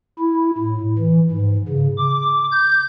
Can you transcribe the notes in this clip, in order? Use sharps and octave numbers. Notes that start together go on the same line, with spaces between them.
E4
A2
E3
G#2
C#3
D6
G6